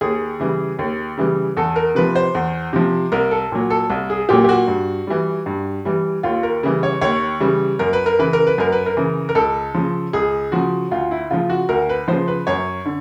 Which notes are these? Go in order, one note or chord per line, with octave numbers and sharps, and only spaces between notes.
D#2 G#4
C#3 E3 G3
D#2
C#3 E3 G3
E2 A4
A#4
C3 F3 B4
C5
E2
C3 F3
C2 A#4
A4
A#2 F#3
A4
C2
G#4
A#2 F#3 G4
G4
F#4
G2
E3 G3
G2
E3 G3
D#2 F4
A#4
C#3 E3 G3
C#5
D#2 C#5
C#3 E3 G3
F#2 A#4
B4
A#4
C#3 E3 B4
A#4
B4
F#2 A#4
B4
A#4
C#3 E3
A#4
C#2 A4
C#3 F3
C#2 G#4
C#3 F3 F#4
D2 F4
E4
C#3 F3 F4
F#4
D2 A#4
B4
C#3 F3 C5
B4
F#2 C#5
D3